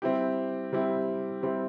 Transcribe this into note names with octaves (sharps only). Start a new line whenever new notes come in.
G3 C4 E4 G4
G3 C4 E4 G4
G3 C4 E4 G4